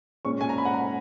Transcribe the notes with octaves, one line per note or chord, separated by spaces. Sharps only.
A#2 G#3 C#4 C#6
G#5
A#5
B5
F#5
A#5